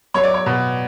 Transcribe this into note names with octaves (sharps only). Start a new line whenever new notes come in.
F#3 C#5
D5
C#5
B2